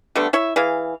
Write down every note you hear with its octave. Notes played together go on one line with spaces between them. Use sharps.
D3 G3 A3 B3
E4 C#5 E5
E3 G#4 F5